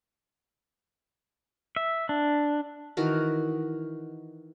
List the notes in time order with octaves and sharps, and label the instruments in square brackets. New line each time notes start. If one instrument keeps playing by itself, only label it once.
[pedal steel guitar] E5
D4
[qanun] D#3 E3 F#4 A#4